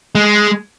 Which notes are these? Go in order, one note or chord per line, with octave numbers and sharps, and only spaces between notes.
G#3